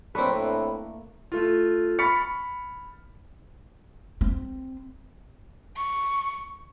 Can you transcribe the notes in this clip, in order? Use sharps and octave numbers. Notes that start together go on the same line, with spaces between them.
A2 A3 A#3 C4 D4 B4
A3 F4
B5 C#6 F6 A6 B6 C#7
B5
C4
C#6